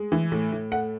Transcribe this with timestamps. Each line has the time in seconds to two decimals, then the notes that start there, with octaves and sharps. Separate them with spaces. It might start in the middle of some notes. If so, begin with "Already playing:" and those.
Already playing: G#3
0.12 E3
0.32 A2
0.52 A2
0.72 A3 F#5